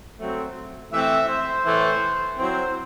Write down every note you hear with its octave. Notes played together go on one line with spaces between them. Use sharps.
F#3 A3 C4
E3 A3 C4 E5
C5
A2 E3 A3
F#3 C4 E4 C5